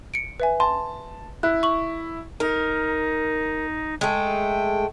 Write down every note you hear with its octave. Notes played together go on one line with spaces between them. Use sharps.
C#7 D7
B4 E5 G#5
A5 C6
E4 F#6
C#6 F#7
D#4 A#4
G#3 A3 G5